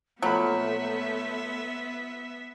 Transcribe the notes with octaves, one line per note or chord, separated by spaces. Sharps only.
A#2 F3 F#3 A3 B3 E5 B5